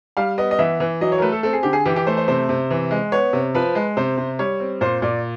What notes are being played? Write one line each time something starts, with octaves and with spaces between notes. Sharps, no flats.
G3 F5
B3 D#5
D#5
E3 E5
E3
F#3 D#5
C#5
A#4
A3 B4
A4
C4 A4
G#4
D3 G4
G#4
E3 G4
G4
A3 C5
C5
C3 C5
C3
E3
G#3
B3 C#5
C3
F3 B4
G#3
C3 C5
C3
G3 C#5
C4
A#2 C5
A#2 D5